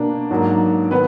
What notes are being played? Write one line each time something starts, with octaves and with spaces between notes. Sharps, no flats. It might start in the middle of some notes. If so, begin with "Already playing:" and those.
Already playing: B2 A#3 D4
G#2 F#3 A#3
D#3 B3 B4